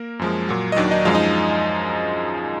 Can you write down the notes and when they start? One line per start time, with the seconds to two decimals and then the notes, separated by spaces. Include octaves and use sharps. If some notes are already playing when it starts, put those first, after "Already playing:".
Already playing: A#3 A#4
0.19 F#2 F3 G#3
0.49 A#2 F#3
0.72 D#5
0.76 D#2 D#3 F#3 D4 D5
0.91 D#4 D#5
1.05 F#2 F3 G#3 F4 F5
1.15 D#4 D#5